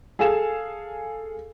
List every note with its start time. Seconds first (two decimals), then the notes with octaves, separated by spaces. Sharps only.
0.19 G#4 A4 F5 G#5 E7